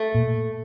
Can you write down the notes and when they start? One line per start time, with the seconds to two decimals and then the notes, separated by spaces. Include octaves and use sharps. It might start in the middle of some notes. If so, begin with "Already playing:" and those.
Already playing: A3
0.14 A#2